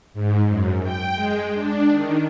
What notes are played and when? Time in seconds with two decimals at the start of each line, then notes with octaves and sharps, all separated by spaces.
0.14 G#2
0.48 F#2
0.83 G5
1.14 G#3
1.54 D4
1.90 D#3